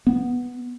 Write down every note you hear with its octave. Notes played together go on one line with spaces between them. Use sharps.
B3